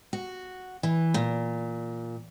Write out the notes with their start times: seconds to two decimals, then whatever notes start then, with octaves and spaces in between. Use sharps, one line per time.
0.13 F#4
0.83 E3
1.14 A#2